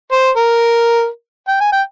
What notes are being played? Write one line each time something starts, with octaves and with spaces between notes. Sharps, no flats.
C5
A#4
G5
G#5
G5